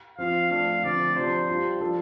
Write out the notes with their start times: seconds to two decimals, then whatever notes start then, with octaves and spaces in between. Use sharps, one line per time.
0.18 F3 C4 F4 F5
0.51 F3 A3 D4 F5
0.83 D3 F3 A3 C4 D5
1.15 C3 F3 D4 C5
1.49 G3 D4 F4
1.80 F3 D4 F4 A4